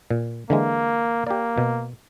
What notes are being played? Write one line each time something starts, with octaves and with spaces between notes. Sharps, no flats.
A#2
D3 E3 G#3 A#3
A#3 G4 D5
B2